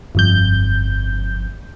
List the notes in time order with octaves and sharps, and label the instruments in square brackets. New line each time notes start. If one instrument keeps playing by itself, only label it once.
[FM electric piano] G1 F2 G6